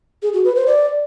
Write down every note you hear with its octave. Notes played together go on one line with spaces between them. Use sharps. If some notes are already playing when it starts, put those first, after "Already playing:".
G#4
F#4
B4
C5
D5